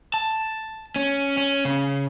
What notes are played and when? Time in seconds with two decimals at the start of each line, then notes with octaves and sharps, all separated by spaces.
0.14 A5
0.96 C#4
1.38 C#4
1.65 C#3